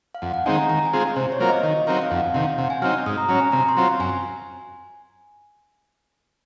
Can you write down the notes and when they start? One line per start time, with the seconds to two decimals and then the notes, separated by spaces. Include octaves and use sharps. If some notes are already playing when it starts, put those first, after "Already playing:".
0.15 F5
0.22 F2 F#5
0.34 F#5
0.46 D#3 G#3 C4 D#4 G#5
0.57 A#5
0.69 D#3 A#5
0.85 G#5
0.93 G#3 C4 F4 G#4
1.16 C3 C5
1.32 C#5
1.40 F#3 A#3 F4 A#4
1.48 D#5
1.63 D#3 F5
1.87 F#3 C4 D#4 A#4 F5
2.02 F5
2.11 F2 F#5
2.34 C3 D#3 F5
2.58 C3 F#5
2.70 G#5
2.82 F#3 C4 D#4 F6
2.93 F6
3.06 G#2 D#6
3.18 A#5
3.29 F#3 C#4 A#5
3.41 G#5
3.52 C3 A#5
3.69 C6
3.77 F#3 C4 F4
3.84 C6
4.00 F#2 G#5